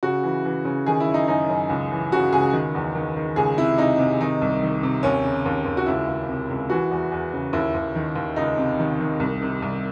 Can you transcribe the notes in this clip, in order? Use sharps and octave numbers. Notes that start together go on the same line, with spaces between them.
C#3 F#4
E3
E3
C#3
D#3 G#4
E4
F#2
D#4
F#2 D#4
F#2
C#2
E3
C#3 F#4
C#2 G#4
D#3
E2
D#3
D#3
C#2 G#4
C3 E4
C3 D#4
C3
D#3 D#4
C2
D#3
C3
D#2 C#4
C#3
D#2
D#2
F#4
C#2 E4
C#2
C3
C#2
E3 F#4
E2
E2
C#3
D#2 E4
D#2
D#3
D#2
C#2 D#4
C3
D#3
D#3
C2
C3
C2